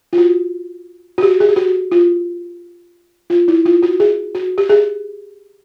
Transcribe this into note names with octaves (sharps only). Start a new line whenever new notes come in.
F4
F#4
F#4
G4
G#4
G4
F#4
F4
F4
E4
F4
F#4
G#4
F#4
G4
G#4